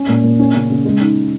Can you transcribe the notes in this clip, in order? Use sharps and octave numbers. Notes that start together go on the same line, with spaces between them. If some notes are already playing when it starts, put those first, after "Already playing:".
Already playing: C#4
A#2
A#2
C#4
C#3
C#3
G#3
D#4